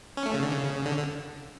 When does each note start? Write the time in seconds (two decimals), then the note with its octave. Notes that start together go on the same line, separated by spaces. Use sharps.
0.17 C#4
0.26 A3
0.34 C#3
0.43 D3
0.52 C#3
0.85 D3
0.98 D3